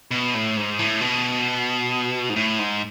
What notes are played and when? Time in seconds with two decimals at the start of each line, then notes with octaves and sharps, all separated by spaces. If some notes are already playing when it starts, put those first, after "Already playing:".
0.11 B2
0.34 A2
0.57 G#2
0.79 A2
1.01 B2
2.29 G#2
2.36 A2
2.59 G#2